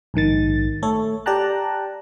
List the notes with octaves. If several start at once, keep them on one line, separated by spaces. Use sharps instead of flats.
A#1 G#2 D#3 A6
A3 A4 C#5
G4 D5 G5 A5 A#5 F#6